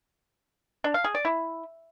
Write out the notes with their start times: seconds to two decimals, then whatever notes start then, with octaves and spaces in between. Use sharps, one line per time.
0.84 D4
0.94 F5
1.04 G#4
1.15 D5
1.25 E4